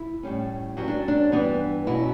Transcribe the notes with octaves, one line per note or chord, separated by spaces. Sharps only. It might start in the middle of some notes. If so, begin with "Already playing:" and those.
Already playing: E4
A2 G3 C#4
G2 F#3 C#4 E4
D4
D4
G2 E3 B3 D4
B2 F#3 C#4 E4